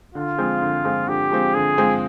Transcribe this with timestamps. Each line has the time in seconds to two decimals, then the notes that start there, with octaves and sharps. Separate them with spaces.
0.15 D3 F4
0.38 F3 G#3 C4
0.61 D3
0.85 F3 G#3 C4
1.07 D3 G4
1.31 F3 G#3 C4
1.54 D3 G#4
1.78 F3 G#3 C4